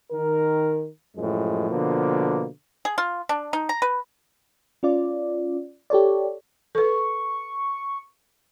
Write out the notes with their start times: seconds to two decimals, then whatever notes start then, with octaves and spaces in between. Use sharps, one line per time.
0.12 D#3 A#4
1.17 F#2 A2 F3 G#3
1.70 B2 D3 F3 A#3
2.85 G#4
2.98 F4
3.29 D4
3.53 D#4
3.69 A#5
3.82 B4
4.83 C#4 F4 D5
5.90 G4 A4 C#5 D5
6.75 A4 B4 C#6